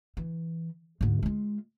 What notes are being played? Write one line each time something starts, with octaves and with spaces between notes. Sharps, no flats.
E3
D2 G#2
G#3 F4